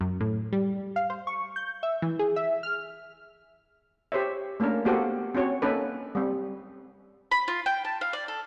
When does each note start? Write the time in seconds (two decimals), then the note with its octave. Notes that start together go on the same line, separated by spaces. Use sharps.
0.01 F#2
0.20 A2
0.52 G3
0.96 F5
1.10 C5
1.27 C#6
1.56 G6
1.83 E5
2.02 E3
2.19 G#4
2.36 E5
2.63 F6
4.12 G4 C5 C#5 E5
4.60 A3 A#3 C#4 D4 A#4
4.85 A#3 B3 F#4 G4 A4 C5
5.35 C4 C#4 F#4 C#5
5.62 A#3 C#4 D#4 A4 B4
6.15 G3 C4
7.31 B5
7.48 F4
7.66 G5
7.85 A5
8.01 F5
8.13 D5
8.28 A4